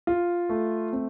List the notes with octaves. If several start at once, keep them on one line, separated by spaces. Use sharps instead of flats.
F4
A3
C4